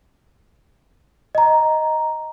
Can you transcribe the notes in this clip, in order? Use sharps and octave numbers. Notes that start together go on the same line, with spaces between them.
D#5 A#5